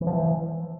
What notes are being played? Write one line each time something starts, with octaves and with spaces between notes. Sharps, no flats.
E3
F3
E3